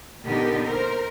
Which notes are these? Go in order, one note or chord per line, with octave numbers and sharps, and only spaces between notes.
A#2 D3 B3 D#4 G4 A#4
A#4 C5